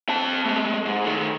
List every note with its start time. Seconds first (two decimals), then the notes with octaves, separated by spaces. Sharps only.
0.09 C4 A5
0.45 G#3 A3
0.86 G#2
1.04 D#3 A3